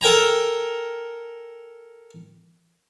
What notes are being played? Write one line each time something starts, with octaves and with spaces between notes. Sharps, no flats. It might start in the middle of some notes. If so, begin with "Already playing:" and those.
A4 A#4 G5 G#5 A#5